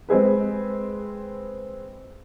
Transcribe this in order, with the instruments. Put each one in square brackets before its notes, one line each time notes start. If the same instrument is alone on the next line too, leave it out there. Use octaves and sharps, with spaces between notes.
[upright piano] G#3 C4 G#4 B4